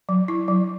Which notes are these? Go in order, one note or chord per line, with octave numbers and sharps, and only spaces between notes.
F#3
E4
F#3